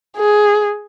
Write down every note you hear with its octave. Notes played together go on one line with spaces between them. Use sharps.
G#4